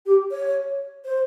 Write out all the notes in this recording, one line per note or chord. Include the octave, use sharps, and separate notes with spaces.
G4
C#5
C5